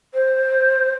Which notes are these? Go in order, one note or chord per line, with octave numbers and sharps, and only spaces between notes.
C5